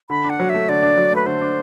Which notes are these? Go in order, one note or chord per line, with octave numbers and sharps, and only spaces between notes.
D3 B5
D4
F#5
F#3
A3 E5
D3 D5
D4
F#3
A3 B4
D3 C5
D4